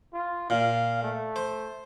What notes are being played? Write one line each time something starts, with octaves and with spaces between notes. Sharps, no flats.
F4
A#2 F5
A3
C5